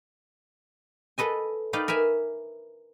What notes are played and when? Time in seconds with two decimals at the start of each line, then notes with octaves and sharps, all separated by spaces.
1.18 A4 B4 D#5 G#5
1.73 D#4 B4 D5 F5 G5
1.88 A#4 B4 E5 G#5